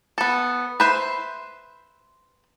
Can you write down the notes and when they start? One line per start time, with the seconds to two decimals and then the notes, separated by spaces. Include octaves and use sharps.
0.18 B3 A4
0.80 B4 C5 E5